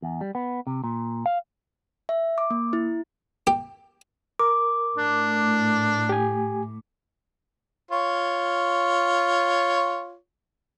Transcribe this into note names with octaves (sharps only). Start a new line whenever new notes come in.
E2
G3
B3
C3
A#2
F5
E5
D6
A#3
E4
G4
A#4 D6
A2 D4
G4 G#5
F4 C#5